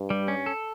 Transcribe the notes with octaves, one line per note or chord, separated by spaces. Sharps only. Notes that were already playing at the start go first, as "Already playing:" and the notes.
Already playing: G2
G3
C#4
A4